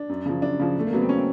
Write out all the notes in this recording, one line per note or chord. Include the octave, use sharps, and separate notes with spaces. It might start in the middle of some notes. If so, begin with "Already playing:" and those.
Already playing: D4
F#2
C#3 F3
F#2 D4
C#3 F3
E2 A3
A#3
C#3 F#3 B3
C4
C#4
C4